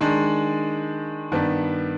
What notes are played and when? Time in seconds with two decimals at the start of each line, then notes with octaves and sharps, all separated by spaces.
0.01 D#3 G#3 D4
1.32 G2 D#3 B3 D4